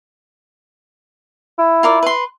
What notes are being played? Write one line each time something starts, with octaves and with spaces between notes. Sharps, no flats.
E4
F4 A#4 D5
B4 C6